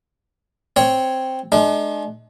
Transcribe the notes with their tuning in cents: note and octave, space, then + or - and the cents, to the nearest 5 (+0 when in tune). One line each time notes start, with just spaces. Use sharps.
C4 +0 C#5 +0
G#3 +45 D4 +35